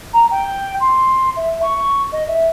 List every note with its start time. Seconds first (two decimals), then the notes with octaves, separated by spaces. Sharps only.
0.13 A#5
0.30 G5
0.80 C6
1.36 E5
1.62 C#6
2.12 D#5
2.27 E5